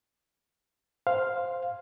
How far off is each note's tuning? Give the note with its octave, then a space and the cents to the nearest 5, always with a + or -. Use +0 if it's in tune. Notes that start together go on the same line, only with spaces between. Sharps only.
C5 +0 F5 +0